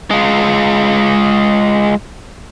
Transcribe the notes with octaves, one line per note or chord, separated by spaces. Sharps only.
G#3 F4